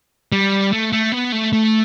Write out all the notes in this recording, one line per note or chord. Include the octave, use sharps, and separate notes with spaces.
G3
A3
A3
B3
A3
A3